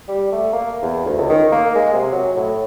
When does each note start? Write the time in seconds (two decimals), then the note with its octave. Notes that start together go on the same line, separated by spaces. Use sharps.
0.08 G3
0.32 A3
0.53 A#3
0.82 E2
1.06 D2
1.18 C#2
1.29 D#3
1.52 A#3
1.75 G#3
1.94 C3
2.12 F#3
2.36 A2